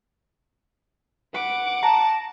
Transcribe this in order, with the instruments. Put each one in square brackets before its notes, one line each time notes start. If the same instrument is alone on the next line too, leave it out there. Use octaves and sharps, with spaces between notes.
[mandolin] B4 [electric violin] F#5 D6
[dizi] A5 [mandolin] A#5